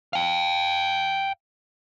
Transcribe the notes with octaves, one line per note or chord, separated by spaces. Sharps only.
F5 G5